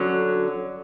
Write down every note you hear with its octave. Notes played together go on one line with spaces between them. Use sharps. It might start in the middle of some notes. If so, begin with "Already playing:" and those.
Already playing: D3 F#3 C#4